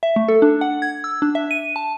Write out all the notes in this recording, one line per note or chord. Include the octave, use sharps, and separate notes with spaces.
E5
A3
A4
D4
F#5
G#6
E6
D4
E5
D#7
A5